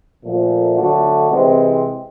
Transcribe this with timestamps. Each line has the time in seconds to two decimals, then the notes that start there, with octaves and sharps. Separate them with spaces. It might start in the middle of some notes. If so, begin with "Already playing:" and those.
0.22 A#2 F3 A3
0.76 D3 F#3 A3 D4 F#4
1.29 C3 E3 G#3 C4